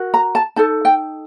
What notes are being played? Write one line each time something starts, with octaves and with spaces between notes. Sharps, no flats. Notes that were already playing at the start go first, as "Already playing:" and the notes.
Already playing: F#4 A#4
A#5
A5
D#4 A4 A5
G5